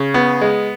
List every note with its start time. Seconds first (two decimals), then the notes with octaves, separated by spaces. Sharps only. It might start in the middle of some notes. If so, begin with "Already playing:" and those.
Already playing: C#3
0.14 B3
0.41 G#3